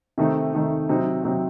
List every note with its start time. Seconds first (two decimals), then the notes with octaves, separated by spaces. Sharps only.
0.18 C3 D#3 A3 D#4
0.53 C3 D#3 A3 D#4
0.89 C3 F#3 C4 D#4
1.24 C3 F#3 C4 D#4